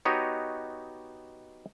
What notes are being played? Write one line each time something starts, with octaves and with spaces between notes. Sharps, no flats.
B3 D#4 F#4 G4 C#5 D#5